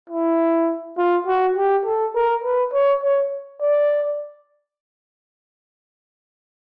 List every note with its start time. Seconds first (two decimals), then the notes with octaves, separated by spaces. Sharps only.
0.10 E4
0.98 F4
1.27 F#4
1.56 G4
1.86 A4
2.15 A#4
2.44 B4
2.73 C#5
3.03 C#5
3.61 D5